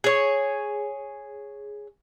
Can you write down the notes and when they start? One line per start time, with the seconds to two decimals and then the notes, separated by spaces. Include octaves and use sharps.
0.04 G#4 C#5